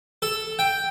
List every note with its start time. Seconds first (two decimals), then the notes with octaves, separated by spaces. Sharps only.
0.22 A4
0.59 G5